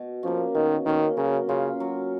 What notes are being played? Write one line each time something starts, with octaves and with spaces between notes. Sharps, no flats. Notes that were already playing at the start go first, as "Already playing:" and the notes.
Already playing: B2
F3 A#3 C#4
B2 D#3
D#3 A#3 C#4
C#3 F#3
C#3 C#4 F4
F#3